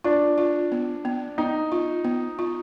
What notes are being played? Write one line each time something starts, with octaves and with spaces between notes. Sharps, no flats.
D4 F4
F4
B3
B3
B3 D#4
F4
B3
F4